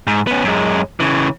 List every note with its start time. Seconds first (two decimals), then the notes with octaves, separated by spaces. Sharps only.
0.07 G#2
0.27 B3 C#4
0.44 F#2 G#3
1.00 C#3 E3